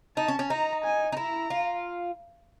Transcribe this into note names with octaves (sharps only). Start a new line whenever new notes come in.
D#4 A5
C#4
C#4
D#4 A#5
G#5
D#4
E4 A#5
F4